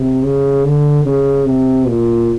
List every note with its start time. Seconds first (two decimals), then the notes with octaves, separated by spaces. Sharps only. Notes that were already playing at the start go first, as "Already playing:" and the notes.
Already playing: C3
0.23 C#3
0.65 D3
1.06 C#3
1.46 C3
1.87 A#2